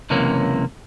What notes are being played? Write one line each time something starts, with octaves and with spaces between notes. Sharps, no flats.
C#2 F#2 C3 E3 A#3 C#4